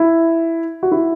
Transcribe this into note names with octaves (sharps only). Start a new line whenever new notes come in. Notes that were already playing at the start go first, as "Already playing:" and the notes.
Already playing: E4
F#4
E4